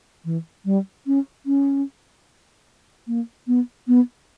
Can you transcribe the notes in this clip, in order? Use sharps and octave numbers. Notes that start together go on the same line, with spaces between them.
E3
G3
C#4
C#4
A#3
B3
B3